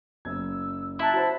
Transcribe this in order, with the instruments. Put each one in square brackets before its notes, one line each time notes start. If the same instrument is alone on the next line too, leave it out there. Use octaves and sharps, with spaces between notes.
[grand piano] F#1 G#6 [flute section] E6
[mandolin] E4 [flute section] A5 A#5 F#6
[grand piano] F#4 C5 [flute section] A5